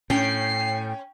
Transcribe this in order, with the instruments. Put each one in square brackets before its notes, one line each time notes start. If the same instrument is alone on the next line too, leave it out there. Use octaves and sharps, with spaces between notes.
[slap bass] A2 [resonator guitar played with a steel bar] C#4 [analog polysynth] G5 [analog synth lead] C7